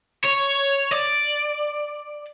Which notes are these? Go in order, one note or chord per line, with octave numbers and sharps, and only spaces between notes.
C#5
D5